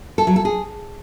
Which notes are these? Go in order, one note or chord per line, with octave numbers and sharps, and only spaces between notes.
A4
F#3
A4
G#4